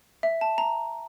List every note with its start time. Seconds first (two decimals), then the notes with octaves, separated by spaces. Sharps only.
0.23 E5
0.41 A5
0.58 A#5